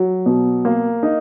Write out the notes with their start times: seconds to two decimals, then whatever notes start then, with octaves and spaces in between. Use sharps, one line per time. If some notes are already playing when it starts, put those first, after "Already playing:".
Already playing: F#3
0.26 B2
0.65 A#3
1.03 D#4